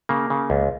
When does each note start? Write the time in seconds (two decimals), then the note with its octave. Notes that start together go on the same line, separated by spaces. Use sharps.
0.09 C#3 A#3
0.30 C#3
0.50 C#2